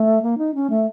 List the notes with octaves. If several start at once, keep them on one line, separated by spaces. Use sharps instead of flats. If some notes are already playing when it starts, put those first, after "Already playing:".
Already playing: A3
A#3
D#4
C#4
A3